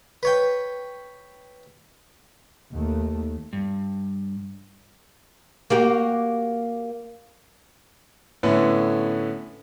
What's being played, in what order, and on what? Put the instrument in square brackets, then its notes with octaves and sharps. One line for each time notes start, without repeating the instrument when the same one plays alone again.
[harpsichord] B4 C#5 G5
[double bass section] D#2 A3
[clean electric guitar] G2
[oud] A#3 F#4 G4
[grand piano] A2 D3 B3 C#4 E4